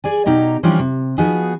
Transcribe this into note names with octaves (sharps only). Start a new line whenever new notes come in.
G#4 D5 G#5
B2 D#4 G4 A#5
E3 F3 G3 C#4 D4 F4
C3
F3 B3 D#4 F#4 G#4